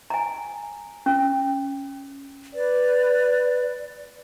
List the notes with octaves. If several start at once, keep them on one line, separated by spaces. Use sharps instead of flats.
G#5 A#5
C#4
B4 D5